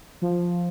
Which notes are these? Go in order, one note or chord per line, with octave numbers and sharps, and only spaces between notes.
F3